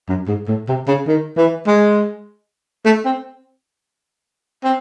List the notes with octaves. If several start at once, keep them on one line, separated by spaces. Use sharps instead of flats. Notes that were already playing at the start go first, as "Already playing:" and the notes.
F#2
G#2
A2
C3
C#3
D#3
E3
G#3
A3
C4
C4